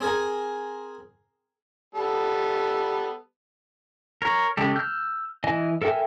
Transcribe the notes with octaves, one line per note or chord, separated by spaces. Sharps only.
C4 G#4 A#4 G#5
G3 B3 A4
A#4 C#5
C#3 G#3 G4 A4
E6 F6 G6
E3 D#5 G#5
A4 A#4 E5 G5 G#5